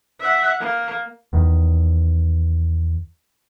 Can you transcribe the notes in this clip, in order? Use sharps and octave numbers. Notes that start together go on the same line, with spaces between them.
E5 F#5
A#3
E2 D#3